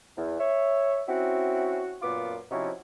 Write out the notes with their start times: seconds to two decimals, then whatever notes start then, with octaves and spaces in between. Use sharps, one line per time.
0.17 E2
0.39 C#5 E5
1.08 C4 C#4 E4 F#4
2.02 F#2 A#2 B3 F4 D6
2.51 C3 F3 C#4 D#4 E4 F#4